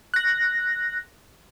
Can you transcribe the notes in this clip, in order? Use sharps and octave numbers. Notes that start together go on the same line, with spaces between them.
F#6 A#6